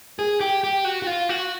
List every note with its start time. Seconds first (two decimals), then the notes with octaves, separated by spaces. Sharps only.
0.19 G#4
0.41 G4
0.64 G4
0.85 F#4
1.02 F#4
1.07 F4
1.29 F#4